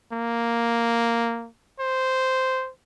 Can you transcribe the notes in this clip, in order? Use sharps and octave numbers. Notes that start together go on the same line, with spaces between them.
A#3
C5